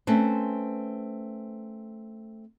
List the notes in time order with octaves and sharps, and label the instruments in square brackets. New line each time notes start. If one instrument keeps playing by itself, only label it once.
[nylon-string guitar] A3 C4 C#4 B4 C5